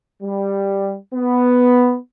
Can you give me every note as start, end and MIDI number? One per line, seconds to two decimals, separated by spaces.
0.23 0.96 55
1.14 1.97 59